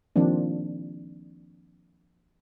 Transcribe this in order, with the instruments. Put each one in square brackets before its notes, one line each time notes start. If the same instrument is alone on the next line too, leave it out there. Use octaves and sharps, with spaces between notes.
[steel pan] D#3 F3 A#3 C4 D4